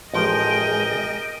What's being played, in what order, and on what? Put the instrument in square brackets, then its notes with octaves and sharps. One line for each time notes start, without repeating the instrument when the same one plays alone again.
[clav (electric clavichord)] A1 F3 [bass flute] G#3 [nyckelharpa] A#4 G5 [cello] D#5